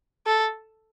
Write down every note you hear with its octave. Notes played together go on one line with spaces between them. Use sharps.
A4